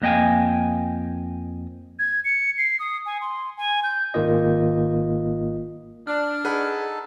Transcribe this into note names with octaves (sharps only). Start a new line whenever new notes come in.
F2 A#3 D#5 G5 G#5
G#6
C#7
C7
D#6
G#5
C6
G#5
G6
G#1 D#3 A#3 F4 D#5
D4 F6
D#4 G#4 A4 B4 F#5 A5